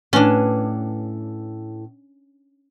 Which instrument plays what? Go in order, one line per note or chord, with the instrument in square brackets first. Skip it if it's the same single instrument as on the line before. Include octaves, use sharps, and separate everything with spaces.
[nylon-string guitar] A2 B4 G#5 [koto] C#4 D4